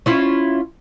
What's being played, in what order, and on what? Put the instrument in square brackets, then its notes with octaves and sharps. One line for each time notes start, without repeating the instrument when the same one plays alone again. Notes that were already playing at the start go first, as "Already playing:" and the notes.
[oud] C#4 E4 F4